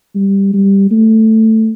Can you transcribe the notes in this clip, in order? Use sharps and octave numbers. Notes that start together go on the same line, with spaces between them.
G3
G3
A3